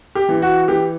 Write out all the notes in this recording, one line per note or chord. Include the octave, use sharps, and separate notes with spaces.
G4
E3
F#4
E3 G4